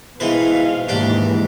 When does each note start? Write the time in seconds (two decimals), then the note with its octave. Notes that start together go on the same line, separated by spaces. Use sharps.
0.20 G#2 B2 E3 B4 F5
0.89 D#2 G#2 E3 D4 G4